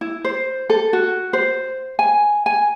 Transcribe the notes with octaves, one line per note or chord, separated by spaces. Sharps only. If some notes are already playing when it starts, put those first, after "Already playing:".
E4
C5
A4
F#4
C5
G#5
G#5